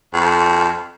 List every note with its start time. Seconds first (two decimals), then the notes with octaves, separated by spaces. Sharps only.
0.14 F2